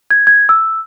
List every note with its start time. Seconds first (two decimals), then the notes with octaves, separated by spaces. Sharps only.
0.11 G#6
0.27 G#6
0.49 E6